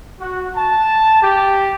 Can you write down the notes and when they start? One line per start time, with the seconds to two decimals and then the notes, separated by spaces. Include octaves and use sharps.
0.20 F#4
0.56 A5
1.21 G4